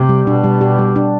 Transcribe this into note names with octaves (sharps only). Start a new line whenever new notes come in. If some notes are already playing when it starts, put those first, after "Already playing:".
Already playing: C3 G4
G3
B2 D4
G3
G4
G3
D4